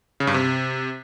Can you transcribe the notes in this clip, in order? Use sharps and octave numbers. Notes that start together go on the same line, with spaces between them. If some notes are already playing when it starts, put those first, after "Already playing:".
C#3
G2
C3